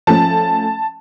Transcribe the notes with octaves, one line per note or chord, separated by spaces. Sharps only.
F3 A3 C#4 A5